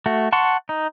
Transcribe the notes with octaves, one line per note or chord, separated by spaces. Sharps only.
A3 F#4
F#5 A5 C6 C#6
D#4